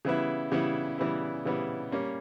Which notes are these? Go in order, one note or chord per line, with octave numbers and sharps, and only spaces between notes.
C#3 E3 G3 B3 E4
C#3 E3 G3 B3 E4
C#3 E3 G3 B3 E4
C#3 E3 G3 B3 E4
G3 A#3 C#4